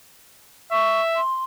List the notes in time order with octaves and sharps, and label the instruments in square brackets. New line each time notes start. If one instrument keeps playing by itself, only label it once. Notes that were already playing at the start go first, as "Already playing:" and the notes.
[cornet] E5 [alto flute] C#6
[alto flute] C6